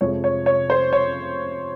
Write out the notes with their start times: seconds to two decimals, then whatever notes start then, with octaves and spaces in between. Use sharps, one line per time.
0.01 F2 C3 F3 G#3 C#5
0.24 C#5
0.46 C#5
0.70 C5
0.93 C#5